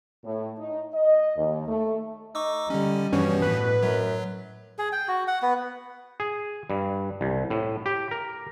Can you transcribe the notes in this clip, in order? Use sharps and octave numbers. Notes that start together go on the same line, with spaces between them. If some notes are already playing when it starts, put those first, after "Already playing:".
A2
D#4
D#5
D#2
A3
D#4 C#6 D6 E6
D3 G3 C#4
G2 B2 E3 F3 C#4
A2 B4
F#2 F#3
G#4
G5
F#4
F#5
B3
G#4
G2
C2
A2
G4
A#4